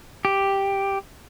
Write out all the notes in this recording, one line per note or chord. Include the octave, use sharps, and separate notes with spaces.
G4